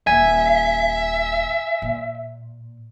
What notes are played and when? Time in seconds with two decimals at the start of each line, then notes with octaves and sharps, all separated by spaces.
0.07 D#1 E5 G#5
1.82 A#2